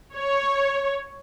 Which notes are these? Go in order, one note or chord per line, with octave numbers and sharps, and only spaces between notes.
C#5